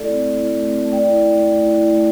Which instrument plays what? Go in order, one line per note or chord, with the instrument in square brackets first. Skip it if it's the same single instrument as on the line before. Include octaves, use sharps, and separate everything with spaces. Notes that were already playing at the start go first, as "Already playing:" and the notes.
Already playing: [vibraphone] A3 E4 A4 D5
C4
A3
E4
A3
C4
A3
A3 D5 G5
E4
E4
A3
A3
E4
E4
A3